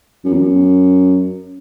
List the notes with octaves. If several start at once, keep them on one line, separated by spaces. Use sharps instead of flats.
F#2
E2
F#2